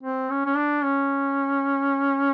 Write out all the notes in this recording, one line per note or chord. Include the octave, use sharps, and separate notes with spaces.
C4
C#4
C#4
D4
C#4